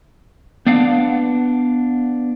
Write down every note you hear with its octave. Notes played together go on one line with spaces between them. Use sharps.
B3 D4 F5 F#5